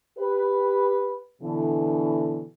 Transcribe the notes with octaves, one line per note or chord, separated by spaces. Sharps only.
G4 B4
B2 D3 E3